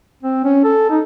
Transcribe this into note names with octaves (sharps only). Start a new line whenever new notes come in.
C4
C#4
A4
D#4